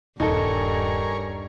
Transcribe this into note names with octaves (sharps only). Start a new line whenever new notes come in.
D#1 G2 D#4 A4 A#4 C#5 G#5